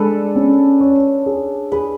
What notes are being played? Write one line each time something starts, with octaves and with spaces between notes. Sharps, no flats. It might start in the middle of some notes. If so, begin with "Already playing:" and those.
Already playing: G#3 D4 A4 B4
C#4
C#5
G#4
G#4 B4